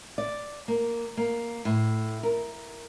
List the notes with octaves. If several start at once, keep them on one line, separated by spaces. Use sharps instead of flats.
D5
A#3
A#3
A2
A#4